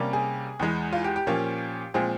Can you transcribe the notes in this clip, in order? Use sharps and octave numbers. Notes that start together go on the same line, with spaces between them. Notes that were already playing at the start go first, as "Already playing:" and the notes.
Already playing: C3 G3 A#3 C#4
G#4
E2 E3 G#3
F4
G4
G4
A#2 F3 A#3 C#4
A#2 F3 G#3 C4 G#4